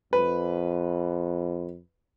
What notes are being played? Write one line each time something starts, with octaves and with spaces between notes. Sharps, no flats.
F2 B4